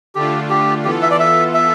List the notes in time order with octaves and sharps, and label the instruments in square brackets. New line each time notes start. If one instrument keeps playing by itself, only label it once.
[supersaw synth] D3 A3 D4 F4 [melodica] G4
[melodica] G4
[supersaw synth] E3 B3 F4 A4 [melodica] G4
[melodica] E5
D5
E5
E5